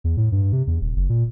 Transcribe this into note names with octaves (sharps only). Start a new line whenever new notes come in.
E2
A2
G2
C3
E2
D#1
F#1
A#2